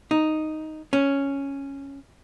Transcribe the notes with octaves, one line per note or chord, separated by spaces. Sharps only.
D#4
C#4